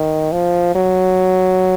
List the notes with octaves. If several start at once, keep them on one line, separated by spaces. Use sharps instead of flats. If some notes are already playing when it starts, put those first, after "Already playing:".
Already playing: D#3
F3
F#3